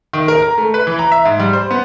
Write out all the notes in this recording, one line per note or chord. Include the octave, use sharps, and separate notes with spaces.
D#3
A#4
A#5
A3
B4
E3
A#5
E5
G#2
G3
C5
B3